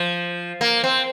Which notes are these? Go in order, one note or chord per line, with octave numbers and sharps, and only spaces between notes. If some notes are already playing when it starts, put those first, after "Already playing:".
Already playing: F3
A#3
C4